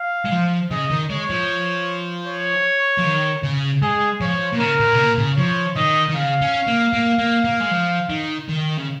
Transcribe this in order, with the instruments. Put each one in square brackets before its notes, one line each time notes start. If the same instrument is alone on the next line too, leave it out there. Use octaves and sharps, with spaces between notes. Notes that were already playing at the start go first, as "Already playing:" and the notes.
Already playing: [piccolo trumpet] F5
[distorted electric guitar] G#3
F3
[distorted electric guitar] C#3 [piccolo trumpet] D#5
[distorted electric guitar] D#3
[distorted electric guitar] G#3 [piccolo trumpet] C#5
[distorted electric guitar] F3
[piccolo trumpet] C#5
[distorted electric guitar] F3
D#3
C#3
[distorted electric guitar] G#3 [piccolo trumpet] G#4
[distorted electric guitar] F3 [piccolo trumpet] C#5
[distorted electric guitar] A#2
[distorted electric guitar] C#3 [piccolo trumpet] A#4
[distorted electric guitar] A#2
C#3
A#2
C#3
[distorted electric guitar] F3 [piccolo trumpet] C#5
[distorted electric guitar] D#3 [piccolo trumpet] D#5
[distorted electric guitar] D#3
[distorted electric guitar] C#3 [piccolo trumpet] F5
[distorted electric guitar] C#4
A#3
A#3
A#3
A#3
G#3
F3
D#3
D#3
C#3